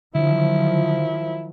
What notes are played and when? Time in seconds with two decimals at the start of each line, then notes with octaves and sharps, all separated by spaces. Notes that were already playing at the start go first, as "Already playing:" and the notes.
0.15 D3 D#3 F3 F#3 E4